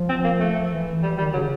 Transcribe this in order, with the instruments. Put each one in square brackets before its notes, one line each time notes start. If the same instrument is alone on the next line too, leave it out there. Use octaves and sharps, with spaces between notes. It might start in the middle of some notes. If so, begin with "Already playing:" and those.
Already playing: [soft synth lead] F3
[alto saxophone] C4
A#3
A3
[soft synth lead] E3
[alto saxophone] G3
[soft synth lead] D#3 [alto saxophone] G3
[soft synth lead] C#3 [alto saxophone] F#3